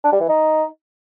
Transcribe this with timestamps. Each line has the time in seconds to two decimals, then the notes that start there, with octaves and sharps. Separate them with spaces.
0.04 D4
0.12 G3
0.20 E3
0.29 D#4